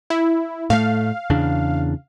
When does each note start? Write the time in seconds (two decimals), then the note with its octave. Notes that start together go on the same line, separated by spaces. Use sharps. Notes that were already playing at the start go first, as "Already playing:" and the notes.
0.10 E4
0.70 A2 A3 F5
1.30 E2 C#3 D4